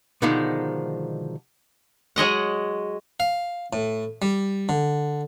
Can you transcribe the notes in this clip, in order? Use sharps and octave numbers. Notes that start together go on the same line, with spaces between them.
B2 D3 D#3 F3 G#3 D#4
F#3 G#3 D#5 F#5
F5
A2
G3
D3